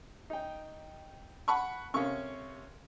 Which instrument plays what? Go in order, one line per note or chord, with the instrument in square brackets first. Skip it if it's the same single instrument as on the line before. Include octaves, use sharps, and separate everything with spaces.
[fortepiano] D#4 G5
[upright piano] F#5 B5 C#6 [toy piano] A5
[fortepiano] C3 C#4 [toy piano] A4 A#4 F5 [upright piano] C#6